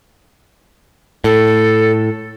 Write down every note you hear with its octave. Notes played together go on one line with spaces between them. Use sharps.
A2 A4